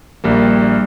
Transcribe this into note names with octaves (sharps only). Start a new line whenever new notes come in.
A#1 G3 A#3